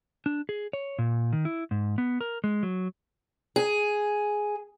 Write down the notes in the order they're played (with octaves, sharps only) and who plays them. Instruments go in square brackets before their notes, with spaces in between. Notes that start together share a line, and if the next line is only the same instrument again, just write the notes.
[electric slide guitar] D4
G#4
C#5
A#2
D#3
E4
G#2
B3
A#4
G#3
F#3
[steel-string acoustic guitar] G#4